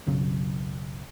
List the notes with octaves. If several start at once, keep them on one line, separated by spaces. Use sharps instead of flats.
B1 F#2 C#3 F#3